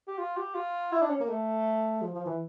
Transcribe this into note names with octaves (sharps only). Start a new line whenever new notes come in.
G4
F4
G4
F4
E4
D4
C#4
A#3
A3
F3
F3
E3